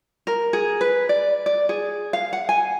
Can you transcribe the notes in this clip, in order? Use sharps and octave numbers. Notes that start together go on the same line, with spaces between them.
A#4
G#4
B4
D5
D5
G#4
F5
F#5
G#5